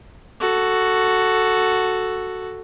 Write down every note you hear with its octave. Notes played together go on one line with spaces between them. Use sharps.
F#4 A4